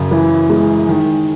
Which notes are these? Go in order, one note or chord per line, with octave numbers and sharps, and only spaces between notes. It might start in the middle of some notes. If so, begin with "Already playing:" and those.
Already playing: F#2 C#3
E3
G#3
D#3